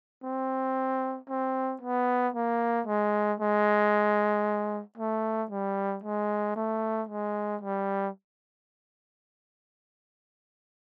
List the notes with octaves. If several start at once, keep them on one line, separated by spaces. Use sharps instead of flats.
C4
C4
B3
A#3
G#3
G#3
A3
G3
G#3
A3
G#3
G3